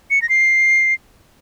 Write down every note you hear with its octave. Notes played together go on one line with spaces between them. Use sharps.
C#7
A#6
C7